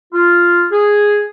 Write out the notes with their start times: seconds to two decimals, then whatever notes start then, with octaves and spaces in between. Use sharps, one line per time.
0.13 F4
0.71 G#4